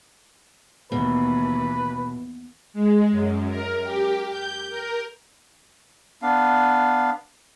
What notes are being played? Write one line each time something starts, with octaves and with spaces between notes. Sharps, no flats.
D#2 B2 E3 B4
G#3
F#2
A#4
G4
G6
A#4
B3 D4 F5